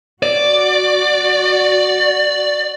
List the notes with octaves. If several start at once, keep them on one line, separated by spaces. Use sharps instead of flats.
F#4 D5